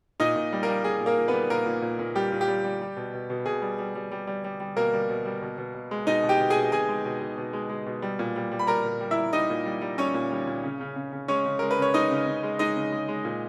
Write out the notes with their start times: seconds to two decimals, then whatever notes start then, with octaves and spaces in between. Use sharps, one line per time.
0.20 A#2 D#4 D#5
0.36 A#2
0.52 G3
0.63 A#3 A#4
0.68 G3
0.84 G3 G#4
1.01 A#2
1.06 A#3 A#4
1.18 A#2
1.28 B3 B4
1.33 G3
1.50 A#2 A#3 A#4
1.66 A#2
1.82 A#2
1.99 A#2
2.15 G3 G4
2.32 A#2
2.41 G4
2.48 G3
2.64 G3
2.81 G3
2.97 B2
3.14 B2
3.30 B2
3.46 B2 G#4
3.62 G3
3.79 G3
3.95 G3
4.12 G3
4.27 G3
4.44 G3
4.60 G3
4.76 B2 A#3 A#4
4.93 G3
5.09 B2
5.26 G3
5.42 B2
5.58 B2
5.75 B2
5.91 G#3
6.07 B2 D#4 D#5
6.23 B2
6.29 G4 G5
6.40 B2
6.50 G#4 G#5
6.56 B2
6.72 B2 G#4 G#5
6.88 G#3
7.05 B2
7.21 B2
7.37 B2
7.53 G#3
7.69 G#3
7.86 B2
8.02 G3
8.19 A#2
8.36 G3
8.52 G3
8.59 B5
8.67 G3 A#4 A#5
8.85 A#2
9.00 G3
9.11 E4 E5
9.17 G3
9.33 G3 D#4 D#5
9.50 A#2
9.65 G3
9.82 G3
9.98 G3 C#4 C#5
10.14 A#2
10.31 G3
10.47 A#2
10.64 C#3
10.80 C#3
10.96 C#3
11.13 C#3
11.28 G#3 C#4 C#5
11.45 C#3
11.59 G#3 A#4
11.71 B4
11.78 C#3 C#5
11.94 G#3 D#4 D#5
12.11 C#3
12.27 C#3
12.43 G#3
12.59 G#3 D#4 D#5
12.76 C#3
12.92 G#3
13.08 G#3
13.25 A#2